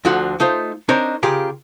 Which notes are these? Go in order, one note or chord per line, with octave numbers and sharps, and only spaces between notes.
D2 D3 F3 F4 F#4 F#5
A3 D#4 F4 C5
C4 D4 D#4 A#4 C5 C#5
C#3 F4 G4 G#4 A#4